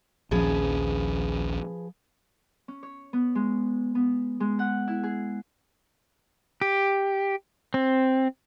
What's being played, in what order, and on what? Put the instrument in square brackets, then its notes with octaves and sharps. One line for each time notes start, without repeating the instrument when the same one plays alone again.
[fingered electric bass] A#1 D#2 C#4 [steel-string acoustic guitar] F3 G#4 B4
[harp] C#4
C#5
B3
G#3
B3
G#3
F#5
E4
G#4
[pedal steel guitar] G4
C4